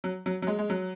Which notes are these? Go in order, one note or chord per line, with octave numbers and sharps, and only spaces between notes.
F#3
F#3
F#3
G#3
G#3
F#3